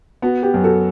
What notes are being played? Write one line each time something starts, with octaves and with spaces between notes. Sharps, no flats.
B3 F#4
G4
F#2
F#4 A4